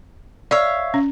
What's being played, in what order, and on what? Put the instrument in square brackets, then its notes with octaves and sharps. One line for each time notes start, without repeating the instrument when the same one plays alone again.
[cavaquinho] C#5 E5 F5 [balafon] D5
[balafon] C#4